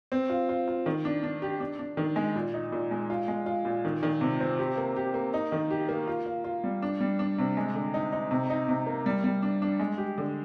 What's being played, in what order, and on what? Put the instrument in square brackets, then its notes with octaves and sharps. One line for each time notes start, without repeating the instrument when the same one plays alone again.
[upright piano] C4
F4
F4
F4
D#3
D4
D4
G4
D4
D4
D#3
G#3
A#2
D#4
A#2
G#3
F4
G#3
F4
A#2
D#3
D#3
C3
C4
G4
A#3
G4
A#3
D#4
D#3
G4
A#3
F4
F4
F4
G3
D4
G3
D4
C3
G#3
D3
D#4
D#4
C3
D#4
C3
A#3
G3
G3
D4
D4
G#3
G4
D3